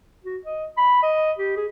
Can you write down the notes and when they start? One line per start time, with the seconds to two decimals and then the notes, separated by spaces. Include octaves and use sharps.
0.24 F#4
0.46 D#5
0.77 B5
1.03 D#5
1.38 G4
1.57 G#4